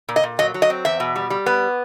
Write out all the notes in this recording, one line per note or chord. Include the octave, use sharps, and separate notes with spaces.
A#2
D#5
A#2
F#3 D#5
F#3
D#5
C4
E2 E5
B2
G3
G3
B3